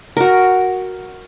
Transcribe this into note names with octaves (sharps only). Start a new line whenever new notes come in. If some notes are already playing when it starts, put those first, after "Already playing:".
F#4 A#4